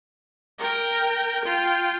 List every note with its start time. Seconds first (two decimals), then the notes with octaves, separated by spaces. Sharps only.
0.59 A#4 G5
1.45 F4 G5